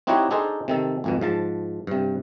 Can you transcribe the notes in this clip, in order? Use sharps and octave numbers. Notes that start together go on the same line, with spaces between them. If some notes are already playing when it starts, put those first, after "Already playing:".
C4 D#4 E4 F#4 G4 C#5
D4 D#4 G#4 A4 C5 D#5
C3 D#3 A4
G#1 F2 B2
G#2 F3 A5
G2 C3